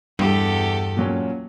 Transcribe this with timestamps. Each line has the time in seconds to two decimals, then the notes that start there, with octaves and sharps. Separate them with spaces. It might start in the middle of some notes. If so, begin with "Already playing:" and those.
0.19 E2 G2 G4 A4
0.97 A#2 F#3 C#4